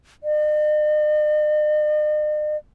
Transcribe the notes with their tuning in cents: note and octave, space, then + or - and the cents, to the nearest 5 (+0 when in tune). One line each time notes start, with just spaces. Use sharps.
D#5 -45